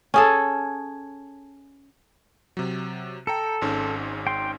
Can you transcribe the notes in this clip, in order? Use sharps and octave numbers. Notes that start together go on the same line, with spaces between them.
C#4 G#4 A4
C3 F#3
A4 G5 A#5 C#7
G#1 G#2 C#4
G5 C6